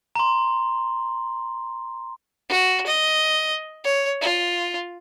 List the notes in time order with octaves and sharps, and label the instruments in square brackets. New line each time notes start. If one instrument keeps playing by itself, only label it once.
[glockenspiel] A#5 C6
[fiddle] F#4
D#5
C#5
F4